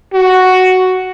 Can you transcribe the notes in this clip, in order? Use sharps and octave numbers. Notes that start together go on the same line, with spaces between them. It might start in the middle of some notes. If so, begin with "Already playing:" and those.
F#4